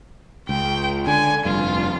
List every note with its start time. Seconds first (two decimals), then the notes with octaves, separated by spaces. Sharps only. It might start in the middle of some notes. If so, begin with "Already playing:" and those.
0.49 C#2 G5
1.07 D3 G#5
1.45 F1 G2 F4